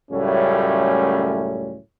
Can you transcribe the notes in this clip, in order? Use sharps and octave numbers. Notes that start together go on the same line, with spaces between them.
C#2 F#2 A2 G3 A3 C#4